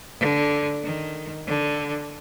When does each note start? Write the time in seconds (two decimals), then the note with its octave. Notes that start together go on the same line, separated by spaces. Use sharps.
0.20 D3
0.83 D#3
1.47 D3